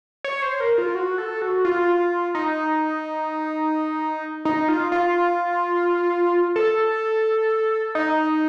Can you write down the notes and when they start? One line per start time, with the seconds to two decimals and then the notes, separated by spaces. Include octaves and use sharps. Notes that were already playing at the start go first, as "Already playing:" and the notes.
0.24 C#5
0.42 C5
0.60 A#4
0.78 F4
0.95 F#4
1.18 A4
1.42 F#4
1.65 F4
2.35 D#4
4.45 D#4
4.69 F4
4.92 F4
6.56 A4
7.95 D#4